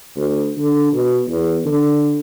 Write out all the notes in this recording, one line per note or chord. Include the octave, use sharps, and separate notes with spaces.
D2
D3
B2
E2
D3